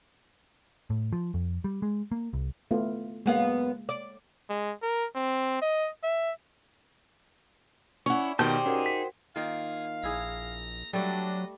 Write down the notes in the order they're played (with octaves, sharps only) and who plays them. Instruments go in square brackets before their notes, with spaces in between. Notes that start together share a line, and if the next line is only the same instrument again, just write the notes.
[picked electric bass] A2
F3
F2
G3
G#3
A#3
C2
[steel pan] A3 B3 F4
[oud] F#2 B3 F5 [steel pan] G#3 A#3
[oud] D5
[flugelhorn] G#3
A#4
C4
D#5
E5
[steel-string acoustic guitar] C#4 E4 [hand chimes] D5 [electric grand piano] F#5 C#6
[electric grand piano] B2 D#3 [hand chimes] G4 D5 [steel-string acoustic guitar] C5 G5 [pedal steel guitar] A5 G6
[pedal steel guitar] D#4 G#4 D6
[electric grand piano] C#4 [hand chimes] F#4 A#4 F#5
[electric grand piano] B6
[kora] D#3 A#3 F4 [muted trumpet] G#4 [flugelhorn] F5
[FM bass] A#1 [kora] E4 G#4 [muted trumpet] A#5
[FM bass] F#3 [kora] G3 A3 D5 [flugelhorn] D4 [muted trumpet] D#5